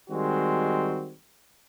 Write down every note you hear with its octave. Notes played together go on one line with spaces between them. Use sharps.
D#3 G3 G#3 C4 F#4